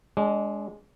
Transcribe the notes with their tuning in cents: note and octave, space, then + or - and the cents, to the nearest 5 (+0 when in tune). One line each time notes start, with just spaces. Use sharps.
G#3 +0 D4 -30